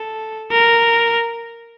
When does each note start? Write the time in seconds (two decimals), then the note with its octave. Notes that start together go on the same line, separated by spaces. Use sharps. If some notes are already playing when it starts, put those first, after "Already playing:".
Already playing: A4
0.51 A#4